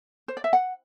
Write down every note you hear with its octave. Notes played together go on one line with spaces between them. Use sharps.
C5
D5
E5
F#5